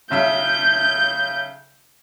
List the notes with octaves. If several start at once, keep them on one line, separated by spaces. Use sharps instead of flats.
B1 C#3 E5 G6